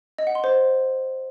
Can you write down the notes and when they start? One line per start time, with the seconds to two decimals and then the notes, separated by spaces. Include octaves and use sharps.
0.18 D#5
0.27 F#5
0.35 C6
0.44 C5